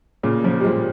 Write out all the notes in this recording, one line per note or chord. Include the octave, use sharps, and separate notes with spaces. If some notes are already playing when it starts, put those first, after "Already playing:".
A#2 C#3
C#3 F3
G3
F3 G#3